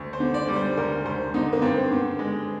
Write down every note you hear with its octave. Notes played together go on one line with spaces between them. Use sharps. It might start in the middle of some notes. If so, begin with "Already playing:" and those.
Already playing: D2
C5
D3
D5
G3
C5
D2 A#4
D2 C5
D3 D#4
A#3
G2 C4
D3
G#3